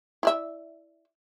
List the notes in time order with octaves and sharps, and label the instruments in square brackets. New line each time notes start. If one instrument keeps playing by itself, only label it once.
[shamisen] E4 D5 E5